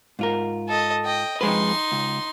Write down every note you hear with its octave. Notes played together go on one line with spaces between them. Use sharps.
G#2 F4 A#4
A4 D#5
D#5 G5
F2 G#3 D#4 B4 C6
C#2